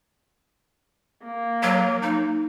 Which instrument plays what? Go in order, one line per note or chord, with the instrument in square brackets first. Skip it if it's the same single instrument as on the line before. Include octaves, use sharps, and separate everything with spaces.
[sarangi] A#3
[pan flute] F#3
D#4